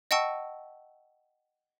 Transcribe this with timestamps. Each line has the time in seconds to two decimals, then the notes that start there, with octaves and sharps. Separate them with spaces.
0.11 D#5 F#5 G5 A5 C#6 E6